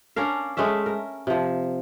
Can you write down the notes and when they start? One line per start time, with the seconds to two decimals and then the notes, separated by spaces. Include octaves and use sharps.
0.16 C#4 D4 A#4 F5
0.57 G#3 A3 C#4 E5
0.86 A#4
1.27 C3 F3